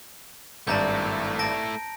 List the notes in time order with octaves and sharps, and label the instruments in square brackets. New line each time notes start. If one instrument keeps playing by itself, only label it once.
[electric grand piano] G#1 G2 D5 [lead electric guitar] A3 E4 [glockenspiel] A5 A#5 G6
[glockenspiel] A5 A#6 D7